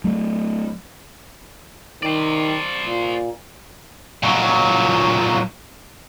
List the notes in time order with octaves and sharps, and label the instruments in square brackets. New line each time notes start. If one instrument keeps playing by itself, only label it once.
[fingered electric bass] F#3 A3
[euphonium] D#3 [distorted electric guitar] C5 D5
[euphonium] A#2
[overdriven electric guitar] A#2 F#3